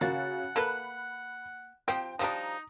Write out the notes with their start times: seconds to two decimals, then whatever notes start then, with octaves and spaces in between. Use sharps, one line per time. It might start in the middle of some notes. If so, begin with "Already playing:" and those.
0.01 C#3 A#3 F#4 F#5 A6
0.56 A#3 A4 B4 B5 F#6
1.88 F3 C4 G4 G5
2.19 F3 G3 D4 D#4 A#5 D#6